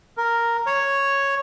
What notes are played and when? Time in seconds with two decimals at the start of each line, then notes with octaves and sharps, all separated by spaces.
0.17 A#4
0.67 C#5